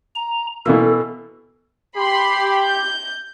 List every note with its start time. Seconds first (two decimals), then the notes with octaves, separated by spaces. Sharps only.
0.15 A#5
0.66 B2 E3 A#3 A4
1.97 G4 B5 C6 C7
2.60 G6